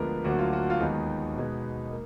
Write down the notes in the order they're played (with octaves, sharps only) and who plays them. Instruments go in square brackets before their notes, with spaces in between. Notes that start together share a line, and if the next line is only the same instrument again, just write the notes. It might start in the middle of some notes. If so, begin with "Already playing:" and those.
Already playing: [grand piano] D2 D3 F3 G#3 B3 A#4 B4
D2 D3 F#3 A#3 F#4
F4
F#4
F4
D#2 D#3 G#3 B3 D#4
B2 G#3 B3
A#3